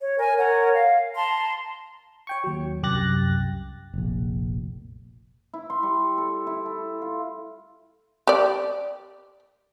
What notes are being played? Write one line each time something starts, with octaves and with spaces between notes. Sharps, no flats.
C#5
A#4 G#5
A#4 C#5 F#5
F5
A5 A#5 C6
C#5 G5 C#6
D#2 F#3
C2 F#2 G4 F#6 A6 A#6
F1 A#1
E4
C6
G3
A4
E4
A4
F4
G4 D5